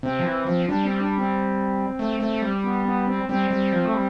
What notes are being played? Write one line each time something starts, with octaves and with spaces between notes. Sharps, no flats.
C3 C4
F3
E3
F3
G3 D4
C4
D4
C4
A3
A3
G3
B3
B3
C4
G3 C4
G3
F3
A3
G3